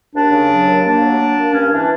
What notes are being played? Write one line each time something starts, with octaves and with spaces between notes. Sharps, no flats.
D#2 D4
C#3
F#3
D#2
A#3 D4
F#3
A#3
A#3
G2 C#4
E3 D4